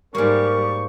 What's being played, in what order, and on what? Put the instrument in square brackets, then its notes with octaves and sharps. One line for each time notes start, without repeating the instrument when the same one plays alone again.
[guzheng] G#2 A#3 [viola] G3 [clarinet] A#4 [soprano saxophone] C#6